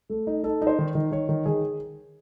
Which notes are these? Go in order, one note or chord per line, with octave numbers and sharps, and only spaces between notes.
A3 A4
D#4
D#4 A4
D#4
C5
D#3
D#3
D#3 C#5
D#3
D#3 G#4